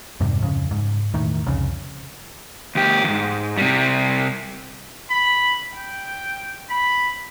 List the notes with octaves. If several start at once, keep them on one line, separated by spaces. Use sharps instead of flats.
F2 G#2 C3 G3
D1 F2 C#3
G#2
E1 A2 D#3
C2 F2 C#3
D2 G4
E2 G#2
C3 G3
B5
G5
B5